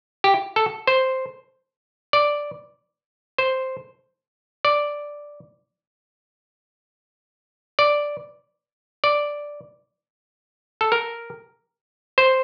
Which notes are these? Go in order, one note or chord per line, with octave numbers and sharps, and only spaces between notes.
G4
A4
C5
D5
C5
D5
D5
D5
A4
A#4
C5